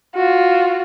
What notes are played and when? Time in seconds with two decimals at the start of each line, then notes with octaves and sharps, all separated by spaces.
0.15 F4 F#4